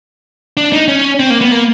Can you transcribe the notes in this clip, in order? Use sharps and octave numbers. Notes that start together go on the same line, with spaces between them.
D4
D#4
C#4
C4
A#3
B3
A#3